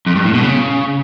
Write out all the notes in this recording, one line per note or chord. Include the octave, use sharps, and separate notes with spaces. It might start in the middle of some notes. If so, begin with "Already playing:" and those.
F2
G2
A2
B2
C#3